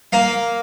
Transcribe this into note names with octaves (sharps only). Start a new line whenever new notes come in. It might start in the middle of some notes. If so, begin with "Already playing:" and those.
A#3 F5